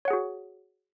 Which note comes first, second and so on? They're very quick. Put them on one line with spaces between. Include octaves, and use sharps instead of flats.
C#5 F#5 G#4 F#4